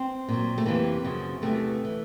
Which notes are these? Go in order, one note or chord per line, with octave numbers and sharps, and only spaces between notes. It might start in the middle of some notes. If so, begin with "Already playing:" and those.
Already playing: C4
A#2 F#3
A3
F2 C3 E3 A#3
F#2 C#3 F3
E2 C3 E3 A3
E3